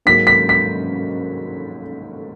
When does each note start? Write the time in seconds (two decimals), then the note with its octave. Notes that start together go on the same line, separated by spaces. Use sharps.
0.06 G#2 F#3 A#3 B6
0.27 B6
0.49 B6